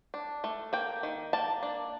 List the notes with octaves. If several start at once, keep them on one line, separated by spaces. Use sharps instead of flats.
D4
A3
A#3 G5
D#3
A#3 A5
D4